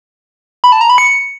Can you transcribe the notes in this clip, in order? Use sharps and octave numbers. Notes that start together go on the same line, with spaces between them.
B5
A5
A#5
B5
C#7